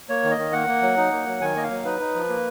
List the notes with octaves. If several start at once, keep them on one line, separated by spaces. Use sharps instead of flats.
A#3 C#5
D#3
D#5
D#3
A#3 F#5
A#3
F#3
D#4
A#3
F#3
D#3 G#5
A#3 D#5
F5
F#3
D#4 B4
D#4
F3
A#3